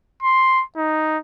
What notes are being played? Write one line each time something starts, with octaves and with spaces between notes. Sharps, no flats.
C6
D#4